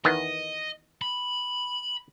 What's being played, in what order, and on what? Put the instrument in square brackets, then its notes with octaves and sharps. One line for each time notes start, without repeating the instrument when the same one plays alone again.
[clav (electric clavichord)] E2 D#3 B3 [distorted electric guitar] D#5
[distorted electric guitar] B5